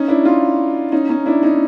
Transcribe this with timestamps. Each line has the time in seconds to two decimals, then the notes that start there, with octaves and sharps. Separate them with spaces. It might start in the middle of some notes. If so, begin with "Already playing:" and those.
Already playing: C#4 D#4
0.08 D4 E4
0.25 D#4 F4
0.92 C#4 D#4
1.09 C#4 D#4
1.26 D4 E4
1.43 C#4 D#4